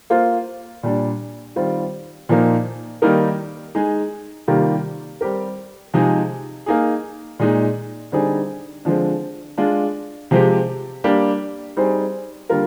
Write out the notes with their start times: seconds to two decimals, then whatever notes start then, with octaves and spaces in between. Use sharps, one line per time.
0.10 A#3 F4 C5
0.83 A#2 G3 D4
1.56 D#3 G3 C4 F4
2.29 A#2 F3 A#3 D#4
3.02 D#3 G3 A#3 D#4 A#4
3.75 G#3 D#4 G#4
4.48 C3 D#3 G3 A#3 F4
5.21 G3 C4 G4 A#4
5.94 C3 F3 G#3 D#4 G#4
6.66 A#3 D#4 G#4
7.39 A#2 G#3 D#4
8.12 D3 G3 C4 D#4 G#4
8.85 D3 F3 G#3 C4
9.58 G#3 D4 F4
10.31 C3 F3 G#3 C4 G4
11.04 G3 A#3 D4 G4
11.77 G3 C4 D#4 G#4 C5
12.50 D3 G3 A#3 F4 A#4